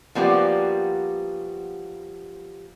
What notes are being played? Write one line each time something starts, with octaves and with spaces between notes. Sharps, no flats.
F3 G3 A#3 B3 F#4 G4